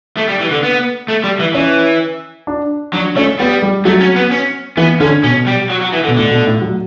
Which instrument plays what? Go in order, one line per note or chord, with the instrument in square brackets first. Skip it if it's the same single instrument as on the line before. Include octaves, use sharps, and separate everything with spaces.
[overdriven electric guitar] A3
G3
E3
D3
B3
A3
G3
E3
[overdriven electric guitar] E3 [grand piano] C#4
[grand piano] D4
[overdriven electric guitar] F#3 [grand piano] D4
[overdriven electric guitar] A3 [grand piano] C#4
[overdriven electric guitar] G3 [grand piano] B3
[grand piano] G3
[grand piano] F#3 [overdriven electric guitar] A3
[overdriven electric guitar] C#4
B3
C#4
[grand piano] E3 [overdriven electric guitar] B3
[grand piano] D3 [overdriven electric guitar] C#4
[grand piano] B2 [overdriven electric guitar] C#4
[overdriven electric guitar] G3
F#3
F#3
E3
D3
[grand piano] B2
[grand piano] A2 [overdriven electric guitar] D3
[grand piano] B2
A2
F#3